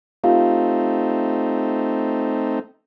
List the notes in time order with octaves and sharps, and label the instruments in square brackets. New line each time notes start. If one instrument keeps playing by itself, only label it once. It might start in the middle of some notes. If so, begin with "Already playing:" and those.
[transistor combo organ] A3 C4 D#4 [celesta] F4 G4 F5